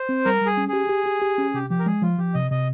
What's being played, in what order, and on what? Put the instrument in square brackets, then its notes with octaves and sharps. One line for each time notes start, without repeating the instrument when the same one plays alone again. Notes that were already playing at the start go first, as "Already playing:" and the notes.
Already playing: [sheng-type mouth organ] C5
[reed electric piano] C4
[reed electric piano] G3 [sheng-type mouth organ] A#4
[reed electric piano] G3 [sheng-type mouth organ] G#4
[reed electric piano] C#4
[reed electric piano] G4 [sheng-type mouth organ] G#4
[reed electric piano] G4
G4
G4
C#4
[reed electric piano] C3 [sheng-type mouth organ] G4
[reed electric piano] F3 [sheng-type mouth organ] G4
[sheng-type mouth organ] A#4
[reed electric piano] G#3 [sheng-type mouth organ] G#4
[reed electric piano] F3 [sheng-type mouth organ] F4
[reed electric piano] F3 [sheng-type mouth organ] G4
[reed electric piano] C3 [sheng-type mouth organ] D#5
[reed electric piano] C3 [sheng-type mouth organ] D#5